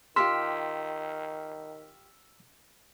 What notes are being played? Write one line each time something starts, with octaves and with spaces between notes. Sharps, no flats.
D#3 F4 G4 A4 C6 E6 F6 B6